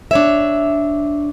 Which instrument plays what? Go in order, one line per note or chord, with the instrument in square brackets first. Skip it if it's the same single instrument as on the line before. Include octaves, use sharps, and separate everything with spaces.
[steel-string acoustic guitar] D4 C#5 E5